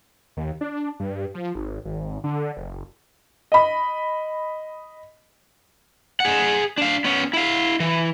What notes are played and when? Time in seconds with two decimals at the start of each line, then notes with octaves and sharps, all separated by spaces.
0.37 D#2
0.61 D4
1.00 G2
1.34 F3
1.55 G#1
1.85 G#1
2.24 D3
2.57 F#1
3.52 D#5 B5
6.20 G#4 F#5
6.78 D4 F5
7.04 B3 C#4
7.33 E4 F5
7.80 E3